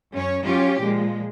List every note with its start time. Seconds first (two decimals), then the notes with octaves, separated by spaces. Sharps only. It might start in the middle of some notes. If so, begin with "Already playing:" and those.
0.12 F#2 C#4 C#5
0.44 F#3 C#4 F4 G4
0.79 A#2 F3 G#3